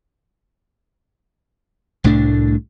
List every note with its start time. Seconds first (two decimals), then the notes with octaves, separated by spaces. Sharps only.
2.04 C2 A2 A3 D4